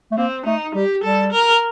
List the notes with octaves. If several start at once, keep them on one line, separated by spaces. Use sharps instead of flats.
A3
A#3 C4
A3 D#4
G3 G4
G3 A4
A#4